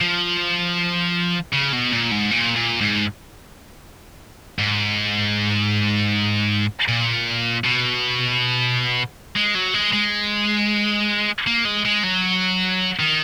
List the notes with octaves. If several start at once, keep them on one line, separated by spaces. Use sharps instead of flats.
F3
C#3
B2
A#2
G#2
A#2
A#2
G#2
G#2
A#2
B2
G#3
F#3
G#3
G#3
A#3
G#3
G#3
F#3
D#3